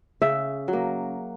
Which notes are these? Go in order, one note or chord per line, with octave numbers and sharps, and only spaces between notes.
C#3 E5
F#3
A#3